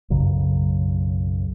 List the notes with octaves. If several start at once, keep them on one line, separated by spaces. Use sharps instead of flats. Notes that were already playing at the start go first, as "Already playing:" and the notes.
B1 F#2 C#3 F#3